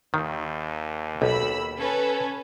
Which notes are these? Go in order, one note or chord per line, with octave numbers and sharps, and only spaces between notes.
D#2 D#3
B1 B5 E6
C#4 A4 B4